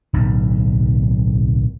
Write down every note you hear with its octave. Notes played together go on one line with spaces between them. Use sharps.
D1 B1